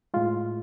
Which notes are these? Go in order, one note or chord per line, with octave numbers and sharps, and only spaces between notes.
A2 G#3 F4